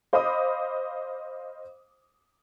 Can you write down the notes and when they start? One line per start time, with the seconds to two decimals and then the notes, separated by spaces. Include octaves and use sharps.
0.13 C5 D#5 F5 B5 D6 D#6